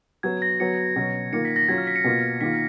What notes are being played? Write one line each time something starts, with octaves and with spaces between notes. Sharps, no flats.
F#3 B3 F#4 G#6
A#6
F#3 B3 F#4 C#7
B2 F#3 C#4
D#3 A#3 F4 C#7
B6
A#6
F#3 C#4 F4 G#6
F6
B6
C#7
B2 A#3 F4
D#3 A#3 F4 B6